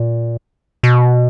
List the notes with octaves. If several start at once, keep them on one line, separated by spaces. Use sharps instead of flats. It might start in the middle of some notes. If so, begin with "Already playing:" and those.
Already playing: A#2
B2